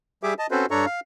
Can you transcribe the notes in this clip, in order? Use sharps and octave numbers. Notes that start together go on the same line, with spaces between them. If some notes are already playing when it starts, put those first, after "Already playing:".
G3 G4 G#4 E5 D6
D#5 A5
C4 C#4 F#4 A4 B4 C5
G2 D4 A4 C#5 A#5 C#6
F5